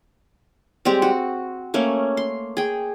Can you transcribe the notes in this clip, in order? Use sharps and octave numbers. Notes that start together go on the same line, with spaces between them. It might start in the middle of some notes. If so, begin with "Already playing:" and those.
G3 G#3 C4 G4
F#4
A3 A#3 C#4
C6
G#4 G5